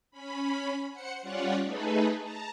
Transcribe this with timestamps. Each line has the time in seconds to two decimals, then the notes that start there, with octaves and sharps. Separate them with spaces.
0.11 C#4 B5
0.92 C5 F#5 C#7
1.21 G3 C#4 F4 C#5 D5 F#5
1.63 A3 D#4 G#4 A4 B4
2.19 A5 A#5